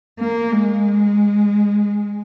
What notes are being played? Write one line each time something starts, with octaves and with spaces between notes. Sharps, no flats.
A#3
G#3